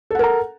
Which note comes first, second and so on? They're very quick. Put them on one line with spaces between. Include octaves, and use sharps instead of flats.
A4 F#5 A#4 A#5